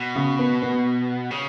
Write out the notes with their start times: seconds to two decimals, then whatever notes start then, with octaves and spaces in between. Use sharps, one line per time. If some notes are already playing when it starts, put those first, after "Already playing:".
Already playing: B2
0.15 C#3
0.39 B3
0.62 B3
1.31 C#3